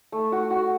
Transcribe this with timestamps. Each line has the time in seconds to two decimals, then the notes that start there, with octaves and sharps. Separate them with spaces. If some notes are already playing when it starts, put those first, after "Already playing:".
0.12 A3
0.32 F#4
0.51 F#4